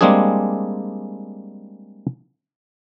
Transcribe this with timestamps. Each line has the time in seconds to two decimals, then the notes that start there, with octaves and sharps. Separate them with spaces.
0.01 G3 G#3 A#3 C4 D4 G#4